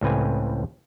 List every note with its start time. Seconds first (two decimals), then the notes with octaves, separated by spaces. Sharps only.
0.01 C#2 A2 C4 B4 G#5